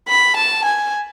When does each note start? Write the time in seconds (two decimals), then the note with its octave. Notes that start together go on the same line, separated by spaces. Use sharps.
0.08 B5
0.36 A5
0.64 G#5